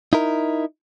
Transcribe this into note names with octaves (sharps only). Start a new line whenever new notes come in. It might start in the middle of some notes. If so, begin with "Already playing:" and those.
D#4 E4 A#4